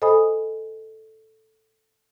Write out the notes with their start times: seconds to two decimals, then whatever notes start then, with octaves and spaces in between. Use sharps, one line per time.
0.02 A4 C5 D#5 G#5 B5 D#6